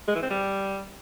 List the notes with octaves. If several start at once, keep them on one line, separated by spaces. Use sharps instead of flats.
G#3
E3
C4
G3